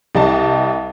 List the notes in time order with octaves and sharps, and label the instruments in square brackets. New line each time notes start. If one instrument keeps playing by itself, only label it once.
[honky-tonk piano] C2 G3 D#5 A5